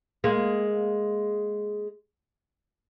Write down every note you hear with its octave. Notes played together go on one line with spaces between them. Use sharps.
G#3 A#3